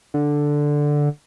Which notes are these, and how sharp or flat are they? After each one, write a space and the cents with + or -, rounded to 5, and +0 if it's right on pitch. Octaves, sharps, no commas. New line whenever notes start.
D3 +0